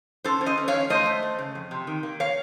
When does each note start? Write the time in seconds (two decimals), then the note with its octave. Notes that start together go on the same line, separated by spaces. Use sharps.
0.24 C#4 A4 C5
0.41 C#4
0.46 C5 D#5
0.58 C#4
0.68 C#5 F5
0.74 C#4
0.90 A3 C5 D#5
1.06 A3
1.23 A3
1.39 C#3
1.55 F2
1.71 C3
1.87 D#3
2.03 A#3
2.20 C#5 F5